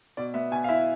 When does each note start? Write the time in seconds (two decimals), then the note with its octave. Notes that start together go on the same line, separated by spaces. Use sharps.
0.17 B2 D5
0.34 B3 E5
0.51 B2 G#5
0.64 F5
0.69 E4 E5